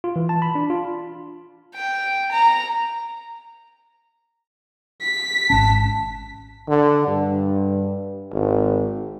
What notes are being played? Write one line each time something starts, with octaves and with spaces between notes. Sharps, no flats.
F4
E3
A5
B5
D4
F4
G5
A#5
B6
G#1 C#4 A5
D3
G2
G#1